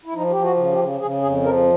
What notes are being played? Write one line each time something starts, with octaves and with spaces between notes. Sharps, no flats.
E4
F3 D#4
F3 G4
F#4
C#3
G4
C#3
C#3 G#4
F2 G#4
F3 A#4